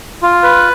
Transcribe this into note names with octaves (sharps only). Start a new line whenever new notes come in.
F4
B4